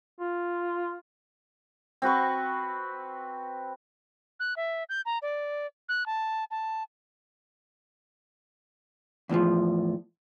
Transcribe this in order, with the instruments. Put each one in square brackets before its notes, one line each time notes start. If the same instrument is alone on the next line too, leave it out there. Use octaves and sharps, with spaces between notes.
[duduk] F4
[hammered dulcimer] C4 F#4 B4 C#6
[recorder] F#6
E5
G6
A#5
D5
F#6
A5
A5
[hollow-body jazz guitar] E2 A2 D#3 F3